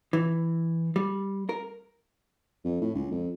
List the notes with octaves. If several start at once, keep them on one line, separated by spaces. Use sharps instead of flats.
E3
G3
A#4
F2
A2
C#2
F2